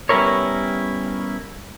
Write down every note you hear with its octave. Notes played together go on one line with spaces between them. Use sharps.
G3 B3 C#4 E4 A#4 C#5